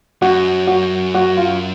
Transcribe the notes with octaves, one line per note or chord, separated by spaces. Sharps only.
F#2 F#4
F#4
F#4
F4